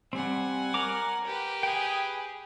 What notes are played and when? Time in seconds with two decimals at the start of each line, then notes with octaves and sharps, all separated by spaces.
0.13 G3 C4 F#5 G#5
0.74 A#4 A#5 D6
1.25 G4 B4
1.63 G#4 G5